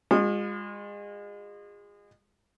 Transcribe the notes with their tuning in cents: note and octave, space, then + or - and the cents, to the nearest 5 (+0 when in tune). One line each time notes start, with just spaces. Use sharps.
G#3 -30 F4 +30 D#6 -25